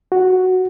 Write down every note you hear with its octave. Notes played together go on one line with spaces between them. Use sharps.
F#4